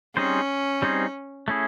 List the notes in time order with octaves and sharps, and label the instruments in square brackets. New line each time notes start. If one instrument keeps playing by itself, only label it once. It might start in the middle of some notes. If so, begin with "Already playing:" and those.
[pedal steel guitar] G3 C4 D#4 G#4 C5 [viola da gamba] C#4
[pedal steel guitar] G3 C4 D#4 G#4 C5
A3 C#4 E4 G#4